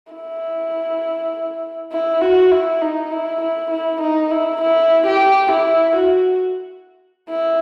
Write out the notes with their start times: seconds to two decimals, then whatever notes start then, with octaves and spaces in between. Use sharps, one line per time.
0.13 E4
1.92 E4
2.21 F#4
2.52 E4
2.82 D#4
3.12 E4
3.41 E4
3.71 E4
4.01 D#4
4.31 E4
4.62 E4
5.07 G4
5.52 E4
5.96 F#4
7.30 E4